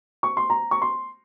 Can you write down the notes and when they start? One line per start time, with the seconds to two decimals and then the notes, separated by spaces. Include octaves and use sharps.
0.23 C#6
0.37 C6
0.50 A#5
0.71 C#6
0.82 C6